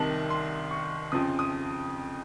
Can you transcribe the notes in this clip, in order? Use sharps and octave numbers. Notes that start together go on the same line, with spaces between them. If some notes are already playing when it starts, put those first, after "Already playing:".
Already playing: C2 C3 D#3 A5
C6
C#6
F2 C#3 F3 D#6
D#6